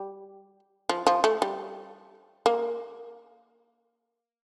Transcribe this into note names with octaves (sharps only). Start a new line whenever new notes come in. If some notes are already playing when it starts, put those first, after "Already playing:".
Already playing: G3
F3
F3
A3
G3
A#3